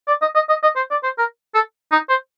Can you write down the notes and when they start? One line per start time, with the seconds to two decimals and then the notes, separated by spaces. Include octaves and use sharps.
0.08 D5
0.22 D#5
0.35 D#5
0.49 D#5
0.63 D#5
0.76 C5
0.91 D5
1.03 C5
1.18 A#4
1.54 A4
1.92 D#4
2.09 C5